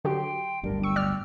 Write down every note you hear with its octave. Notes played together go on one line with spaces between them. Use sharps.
D3 F#3 G4 G5 C6
D1 G1 G3 D4 A#4
G5 C#6 E6
D5 F6